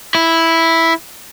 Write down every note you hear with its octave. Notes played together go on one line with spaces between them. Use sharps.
E4